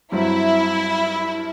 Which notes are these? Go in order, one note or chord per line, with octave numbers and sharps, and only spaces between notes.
G2 F#3 C4 E4